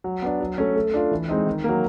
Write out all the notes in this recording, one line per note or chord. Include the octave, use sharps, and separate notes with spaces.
F#3
B3 D4
F#3
A3 C#4
A3
D4 F4
E3
G#3 C4 D#4
D#3
F#3 A#3